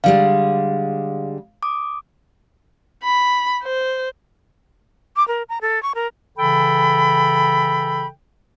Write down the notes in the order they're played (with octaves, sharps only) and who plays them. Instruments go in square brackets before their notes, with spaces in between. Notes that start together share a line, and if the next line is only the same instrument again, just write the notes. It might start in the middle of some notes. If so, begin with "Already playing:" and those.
[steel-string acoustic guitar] D3 G3 G#3 [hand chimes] F5
[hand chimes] D6 D#6
[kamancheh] B5
C5
[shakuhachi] D6
A#4
A#5
A4
C#6
A#4
[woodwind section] C#3 E3 A4 G5 B5